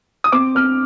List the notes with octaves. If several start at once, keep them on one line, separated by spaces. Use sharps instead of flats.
D#6
C4 D6
C4 F6